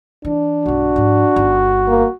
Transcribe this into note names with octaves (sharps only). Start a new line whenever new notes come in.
E3 D4
B1 G2 F#4
G#2 F3
G1 D#4
A#3